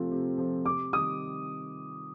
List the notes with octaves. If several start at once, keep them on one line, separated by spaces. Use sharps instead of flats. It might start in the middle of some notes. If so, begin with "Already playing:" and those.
Already playing: C3 F3 A3 C4 F4
C3
F3 A3 C4 F4
C3 D6
D#3 G3 D#6